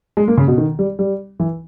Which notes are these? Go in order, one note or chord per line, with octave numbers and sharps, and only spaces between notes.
G#3
A#3
C#3
B2
D#3
G3
G3
E3